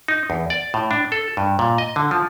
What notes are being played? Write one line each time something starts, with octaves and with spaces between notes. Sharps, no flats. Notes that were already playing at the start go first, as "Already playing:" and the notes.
D#4
E2
D5
A2
D4
A4
G2
A#2
D#5
D3
F3